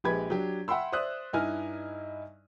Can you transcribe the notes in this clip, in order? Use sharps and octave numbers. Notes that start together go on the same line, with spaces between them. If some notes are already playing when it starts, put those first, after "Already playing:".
A#1 G#3 G4 B4 B5 G#6
F#3 D4 G4
E5 F#5 G5 B5 C6 E6
C5 D5 E5 D#6 F#6
G2 D#4 E4 G#5 F6